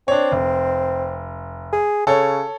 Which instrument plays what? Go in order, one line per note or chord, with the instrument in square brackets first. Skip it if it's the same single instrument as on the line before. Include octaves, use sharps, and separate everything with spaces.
[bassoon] C4 [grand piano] D4 C#5
[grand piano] F1
[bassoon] G#4
[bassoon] C#3 [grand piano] A4 C#5